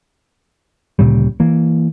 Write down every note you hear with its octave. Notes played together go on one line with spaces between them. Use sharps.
D2 A#2 C#3 G3
E3 A#3